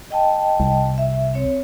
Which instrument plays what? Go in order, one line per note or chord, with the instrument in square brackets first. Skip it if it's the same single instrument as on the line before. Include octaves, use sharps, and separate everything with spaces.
[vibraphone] D#5 G5 A5
[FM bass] C2
[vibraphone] E5
C4 C#5